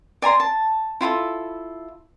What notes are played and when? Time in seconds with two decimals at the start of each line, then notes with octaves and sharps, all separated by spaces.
0.22 D5 G#5 A#5 C6
0.40 A5
1.01 E4 F4 G4 A4